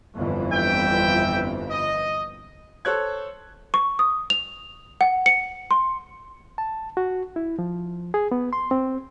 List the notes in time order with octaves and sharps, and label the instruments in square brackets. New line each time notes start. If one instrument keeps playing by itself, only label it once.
[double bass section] G1 F2 E3
[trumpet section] E5 G5
D#5
[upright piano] A4 C5 C#5 F#6 G#6
[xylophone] C#6
D#6
F7
F#5
C#7
C6
[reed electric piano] A5
F#4
E4
F3
G#4
B3
C6
C4